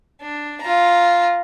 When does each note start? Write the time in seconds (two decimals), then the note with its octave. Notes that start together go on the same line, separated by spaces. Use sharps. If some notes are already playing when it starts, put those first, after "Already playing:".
0.21 D4
0.61 F4 A#5